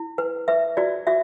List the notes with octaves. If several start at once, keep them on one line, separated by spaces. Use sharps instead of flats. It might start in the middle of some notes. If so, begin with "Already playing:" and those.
Already playing: E4
B4
B4 E5
F#4 D5
F#4 E5